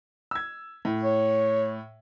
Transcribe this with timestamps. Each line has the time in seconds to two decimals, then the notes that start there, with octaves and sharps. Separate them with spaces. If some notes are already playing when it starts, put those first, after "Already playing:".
0.31 E6 G#6
0.85 A2
1.03 C#5